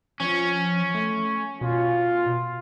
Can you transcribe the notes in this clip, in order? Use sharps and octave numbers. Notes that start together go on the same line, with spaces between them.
F3 C#4
A3
B2 F4